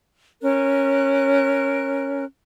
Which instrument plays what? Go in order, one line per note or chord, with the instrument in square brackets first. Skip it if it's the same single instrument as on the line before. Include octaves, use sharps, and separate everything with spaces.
[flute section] C#4 A#4 F#6